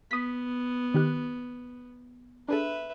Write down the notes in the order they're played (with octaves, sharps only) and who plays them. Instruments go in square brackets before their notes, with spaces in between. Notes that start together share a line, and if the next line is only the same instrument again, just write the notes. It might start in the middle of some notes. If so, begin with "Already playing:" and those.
[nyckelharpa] B3 [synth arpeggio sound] D#6 B6
[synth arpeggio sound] D#3 G4 F#6
[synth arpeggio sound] D4 G#4 A4 [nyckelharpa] B4 E5